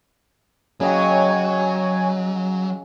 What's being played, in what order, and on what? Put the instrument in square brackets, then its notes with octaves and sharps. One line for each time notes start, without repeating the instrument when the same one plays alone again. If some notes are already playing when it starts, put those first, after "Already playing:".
[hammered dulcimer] C#3 D#5 G5 [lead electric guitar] F#3 [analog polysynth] C#5 G#5